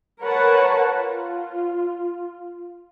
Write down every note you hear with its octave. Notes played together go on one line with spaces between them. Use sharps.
A#4 B4 C#5 F#5 A5
F4